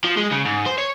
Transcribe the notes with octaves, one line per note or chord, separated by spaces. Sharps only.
F3
G#3
C#3
G#2
C5
C#5